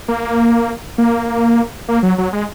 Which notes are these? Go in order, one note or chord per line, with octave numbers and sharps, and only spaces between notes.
A#3
A#3
A#3
F#3
F#3
G#3